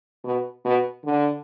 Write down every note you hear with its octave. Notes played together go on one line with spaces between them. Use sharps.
B2
B2
D3